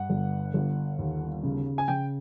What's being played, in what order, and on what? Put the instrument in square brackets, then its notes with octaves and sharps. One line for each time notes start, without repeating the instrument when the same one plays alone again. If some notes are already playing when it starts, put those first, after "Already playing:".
Already playing: [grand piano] G2 F#5
G1
G1
D#2
C#3
G#5
C#3 G5